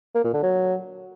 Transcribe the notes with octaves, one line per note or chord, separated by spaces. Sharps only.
A#3
A#2
D3
F#3